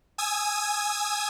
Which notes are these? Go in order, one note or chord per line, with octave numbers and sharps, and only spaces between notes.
G#5 D#6 E6 G#6